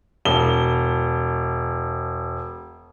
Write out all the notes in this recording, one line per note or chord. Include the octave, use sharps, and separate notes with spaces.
E1 G7